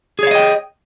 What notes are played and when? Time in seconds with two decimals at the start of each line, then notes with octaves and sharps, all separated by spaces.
0.19 G#4
0.23 C#5
0.27 F5
0.31 D#5
0.35 G5